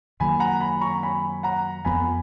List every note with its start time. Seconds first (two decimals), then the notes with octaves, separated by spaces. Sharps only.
0.20 F#2 D#3 F#3 A#3 G#5 B5
0.40 F#5 A#5
0.61 G#5 B5
0.81 A#5 C#6
1.03 G#5 B5
1.43 F#5 A#5
1.85 F2 F3 B3 G#5 B5